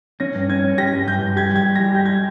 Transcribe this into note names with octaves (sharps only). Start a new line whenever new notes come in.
C#4 A#6
G2
C#4 G#6
C#4
G4 A#6
G2
G2 G6
G2
G4 G#6
G3 G#6
G4
A#6
G3
G4 G6
G#6